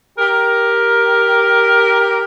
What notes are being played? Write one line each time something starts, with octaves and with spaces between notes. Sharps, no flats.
G4 A#4